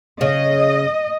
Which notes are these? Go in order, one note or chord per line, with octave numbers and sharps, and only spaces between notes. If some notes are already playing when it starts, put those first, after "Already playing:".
C#3 D#5